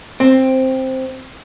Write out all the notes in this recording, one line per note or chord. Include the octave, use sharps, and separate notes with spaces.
C4